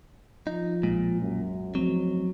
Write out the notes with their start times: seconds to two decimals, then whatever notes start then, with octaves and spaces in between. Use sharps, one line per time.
0.47 F3 D#4 F4
0.83 B1 A#2 G#3
1.20 F#2
1.75 F#1 G#2 F3 F#3 A3 C4